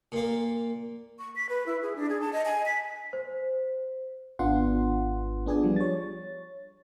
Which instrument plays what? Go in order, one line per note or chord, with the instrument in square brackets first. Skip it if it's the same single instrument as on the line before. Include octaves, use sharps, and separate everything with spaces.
[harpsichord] A#2 A#3
[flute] C#6
B6
B4
E4
G#4
D4
G#4
A5
D#5
G#5
B6
[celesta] C5
[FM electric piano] G#1 B3 D4 F4 F#5 C6
B3 D4 G#4 D5 G#5
F3 G3
C#5 A6